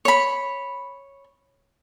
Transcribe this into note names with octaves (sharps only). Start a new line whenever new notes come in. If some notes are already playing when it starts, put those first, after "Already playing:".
C#5 B5